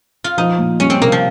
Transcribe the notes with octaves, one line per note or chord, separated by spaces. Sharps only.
F4
F3 D#4
A#2
G3 C#4
C4
C3 A#3
F3